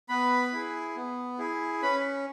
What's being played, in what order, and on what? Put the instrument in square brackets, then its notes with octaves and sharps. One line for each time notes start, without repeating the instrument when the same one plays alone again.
[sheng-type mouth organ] B3 B4 B5
E4 G#4
B3
E4 G#4
C#4 B4 B5